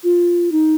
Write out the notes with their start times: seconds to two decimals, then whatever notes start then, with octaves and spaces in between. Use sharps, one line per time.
0.04 F4
0.52 D#4